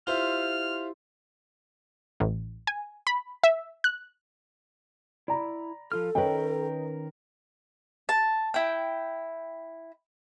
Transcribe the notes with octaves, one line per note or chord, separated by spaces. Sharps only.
E4 F4 G4 C5 E5 C6 F6
A1
G#5
B5
E5
F#6
E4 D5 A#5 B5
F3 F4 A4 F6
D#3 C#4 A#4 B4 C#5 D#5 G5
A5
E4 G5